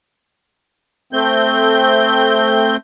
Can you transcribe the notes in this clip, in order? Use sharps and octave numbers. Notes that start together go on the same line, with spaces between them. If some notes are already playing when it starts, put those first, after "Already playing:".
A3 C4 G6